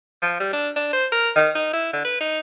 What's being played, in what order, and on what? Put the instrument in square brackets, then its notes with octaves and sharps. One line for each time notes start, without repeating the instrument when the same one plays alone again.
[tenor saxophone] F3
G3
D4
D4
C5
A#4
D#3
D#4
E4
D3
B4
D#4